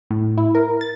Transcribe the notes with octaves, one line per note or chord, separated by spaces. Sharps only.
A2
E4
A#4
A6